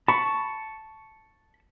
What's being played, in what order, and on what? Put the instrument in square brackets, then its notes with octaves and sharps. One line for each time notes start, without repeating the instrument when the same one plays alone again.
[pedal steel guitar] A5 C#6 [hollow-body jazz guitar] B5